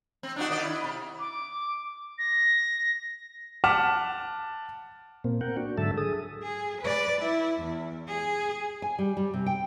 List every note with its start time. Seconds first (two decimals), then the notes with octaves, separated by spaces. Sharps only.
0.23 C4
0.36 D4 D#4 F#4
0.50 D#3 D5 D#5
0.63 E4
0.84 C3
1.19 D6
2.19 A#6
3.64 F#5 A5 D6 F6 B6 E7
5.24 A#2 A#3 C4
5.41 A#4 F#5 G5
5.57 D4 F#4
5.78 G#2 D3 F#3 A4 E5 A5
5.98 G#4 A4 D#6
6.43 G#4
6.81 B4 D5
7.20 E4
7.60 E2
8.07 G#4
8.82 G#5
8.99 G3
9.17 G3
9.34 C3
9.46 G5